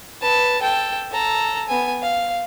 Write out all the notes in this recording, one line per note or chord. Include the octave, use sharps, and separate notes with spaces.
B4 A5
A4 G5
A4 A#5
B3 G#5
F5